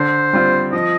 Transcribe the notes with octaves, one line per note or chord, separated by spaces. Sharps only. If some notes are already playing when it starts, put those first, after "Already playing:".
Already playing: D3 C5
G3 C4 F4
F3 D#5